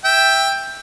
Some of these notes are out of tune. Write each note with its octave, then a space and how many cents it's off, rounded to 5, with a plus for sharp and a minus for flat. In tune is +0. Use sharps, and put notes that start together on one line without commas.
E5 +0 G5 +10